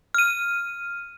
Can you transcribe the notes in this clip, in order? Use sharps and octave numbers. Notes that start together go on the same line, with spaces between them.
F6 D#7